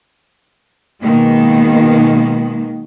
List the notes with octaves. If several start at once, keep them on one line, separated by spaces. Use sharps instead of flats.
B2 D#3 G#3 A#3